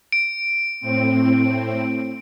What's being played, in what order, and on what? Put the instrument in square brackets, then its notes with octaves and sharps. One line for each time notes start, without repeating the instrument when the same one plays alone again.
[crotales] D7
[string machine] A2 C4